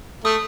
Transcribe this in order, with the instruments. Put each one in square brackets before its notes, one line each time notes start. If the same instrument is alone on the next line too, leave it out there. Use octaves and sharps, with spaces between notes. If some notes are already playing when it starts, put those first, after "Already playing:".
[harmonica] A3 [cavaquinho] D#6